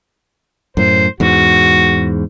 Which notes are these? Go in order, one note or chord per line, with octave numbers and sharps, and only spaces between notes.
F#2 A2 C5
E2 G#2 F#4